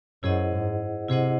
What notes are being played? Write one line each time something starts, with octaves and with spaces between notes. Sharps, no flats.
F#2 E4 G#4 C5 D#5 F#5
G#2
C3 E4 G#4 C5 D#5 F#5